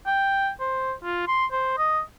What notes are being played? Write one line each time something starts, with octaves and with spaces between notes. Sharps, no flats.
G5
C5
F4
C6
C5
D#5